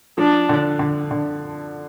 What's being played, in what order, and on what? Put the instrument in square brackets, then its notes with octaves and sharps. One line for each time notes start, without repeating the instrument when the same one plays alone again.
[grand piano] F3 [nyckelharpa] D4
[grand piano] D3
D3
D3